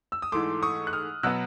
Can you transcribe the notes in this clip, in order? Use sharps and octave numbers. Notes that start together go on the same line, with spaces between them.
E6
D#6
G#2 E3 A3 C6 D6
C#6 D#6
F#6
D#6 F6
B2 F#3 B3 E6 F#6